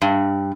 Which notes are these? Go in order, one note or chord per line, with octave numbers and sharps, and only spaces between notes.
G2